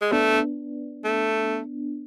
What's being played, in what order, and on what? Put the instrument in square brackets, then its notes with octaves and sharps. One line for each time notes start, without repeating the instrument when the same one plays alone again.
[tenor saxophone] G#3
[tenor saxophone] A3 [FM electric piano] B3 D4
[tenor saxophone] A3